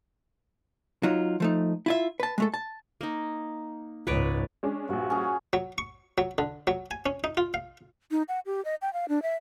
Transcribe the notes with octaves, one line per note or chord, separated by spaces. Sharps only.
F#3 D#4 F4
F3 A3 D#4
E4 F4 E5
B4 A5
G#3 A3 A4
A5
A#3 D#4
C#2 G#2 B4 C#5 D5
G#3 C#4 D4
A#1 G2 F#4
C#4 G#4
F#3
C#6
F#3
D3
F#3
G#5
C#4
D#4
F4
F5
D#4
F#5
G4
D#5
G5
F5
D4
E5